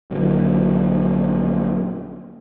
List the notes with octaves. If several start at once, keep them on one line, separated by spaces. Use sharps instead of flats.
A#1 D3 F#3 A#3